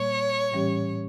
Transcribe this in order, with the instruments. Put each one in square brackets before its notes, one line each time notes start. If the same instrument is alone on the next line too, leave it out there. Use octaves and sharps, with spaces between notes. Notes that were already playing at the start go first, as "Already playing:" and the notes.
Already playing: [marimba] A#2 G3 A#3 [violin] C#5
[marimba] A2 E3 G3 C#4 G4